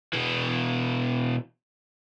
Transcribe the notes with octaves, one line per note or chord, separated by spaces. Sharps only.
B2 E3